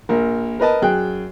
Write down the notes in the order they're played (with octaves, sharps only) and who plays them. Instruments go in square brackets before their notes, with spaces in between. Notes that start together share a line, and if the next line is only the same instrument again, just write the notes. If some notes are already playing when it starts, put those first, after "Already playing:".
[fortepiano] A#1 A#4
A#4 B4 D#5 A5
F#2 G#4 G5 F#6